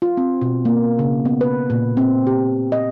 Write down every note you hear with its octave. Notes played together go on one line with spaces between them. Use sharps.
F4
C4
B2
A#3
C#3
B3
B4
A#2
C4
G4
D#5